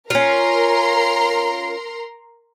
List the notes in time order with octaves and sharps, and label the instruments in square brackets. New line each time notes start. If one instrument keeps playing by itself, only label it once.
[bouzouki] C#4 F4 [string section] A#4 A#5 C6